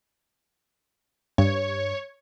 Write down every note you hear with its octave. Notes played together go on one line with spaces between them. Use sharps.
G2 C#5